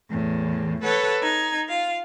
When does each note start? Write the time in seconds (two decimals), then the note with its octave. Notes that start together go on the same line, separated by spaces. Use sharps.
0.10 E2 A2
0.83 A4 B4 C#5 F#5
1.21 D#4 G#6
1.68 F4 F5